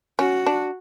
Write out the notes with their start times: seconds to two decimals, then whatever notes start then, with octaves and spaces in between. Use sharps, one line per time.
0.19 C#4 F#4
0.46 D4